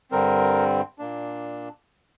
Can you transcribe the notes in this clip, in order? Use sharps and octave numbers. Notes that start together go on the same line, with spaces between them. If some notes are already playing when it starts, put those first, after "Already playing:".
G2 D3 G3 C4 A#4
A#2 A#3 D4